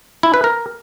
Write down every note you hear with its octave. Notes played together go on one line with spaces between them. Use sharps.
E4
B4
A#4